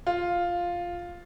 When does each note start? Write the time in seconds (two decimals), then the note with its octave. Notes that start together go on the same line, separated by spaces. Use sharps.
0.07 F4